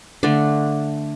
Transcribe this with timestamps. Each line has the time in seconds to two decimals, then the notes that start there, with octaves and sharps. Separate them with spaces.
0.23 D3 A3 D4